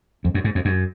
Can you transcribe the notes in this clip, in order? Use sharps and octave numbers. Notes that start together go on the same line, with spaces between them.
F2
F#2
G#2
F2
F#2